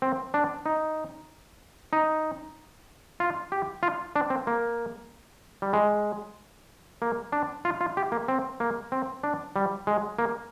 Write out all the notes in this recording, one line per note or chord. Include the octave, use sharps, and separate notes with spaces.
C4
D4
D#4
D#4
F4
G4
F4
D4
C4
A#3
G3
G#3
A#3
D4
F4
F4
G4
A#3
C4
A#3
C4
D4
G3
G#3
A#3